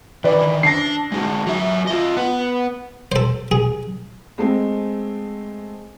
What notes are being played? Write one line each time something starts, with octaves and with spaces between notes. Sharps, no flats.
D#3 E3 B4 D5
D4 G#5 A5 A#6 C7
G#3 D#4 F#4
F#3 E5
F4 D#5
B3 B4
A4 C5
G#4
G#3 A3 C4